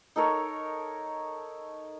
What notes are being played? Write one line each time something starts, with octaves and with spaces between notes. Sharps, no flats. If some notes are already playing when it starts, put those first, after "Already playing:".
D#4 A4 A#4 C#5